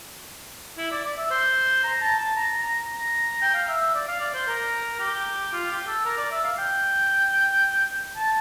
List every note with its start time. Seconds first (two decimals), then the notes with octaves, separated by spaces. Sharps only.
0.78 E4
0.91 D5
1.05 D5
1.17 E5
1.31 C5
1.83 A#5
2.01 A5
2.18 A5
2.36 A#5
2.63 A#5
3.42 G5
3.54 F5
3.68 E5
3.81 E5
3.94 D5
4.08 F5
4.20 D5
4.34 C5
4.48 A#4
4.99 G4
5.53 F4
5.70 G4
5.87 A4
6.05 A#4
6.18 D5
6.31 E5
6.44 F5
6.58 G5
8.16 A5